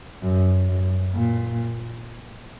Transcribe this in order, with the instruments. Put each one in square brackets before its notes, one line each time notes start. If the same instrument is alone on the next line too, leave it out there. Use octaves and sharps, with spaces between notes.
[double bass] F#2
F#2
A#2